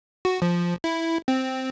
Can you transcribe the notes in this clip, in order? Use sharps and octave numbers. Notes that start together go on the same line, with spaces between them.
F#4
F3
E4
C4